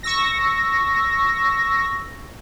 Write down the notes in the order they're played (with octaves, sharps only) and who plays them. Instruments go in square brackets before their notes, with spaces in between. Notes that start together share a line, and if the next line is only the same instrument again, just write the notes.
[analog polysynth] C#6 E6 A#6